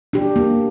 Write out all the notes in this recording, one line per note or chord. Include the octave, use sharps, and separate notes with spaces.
D4 G4
A#3